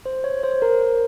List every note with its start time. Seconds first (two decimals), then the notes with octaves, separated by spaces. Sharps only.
0.06 C5
0.24 C#5
0.43 C5
0.62 A#4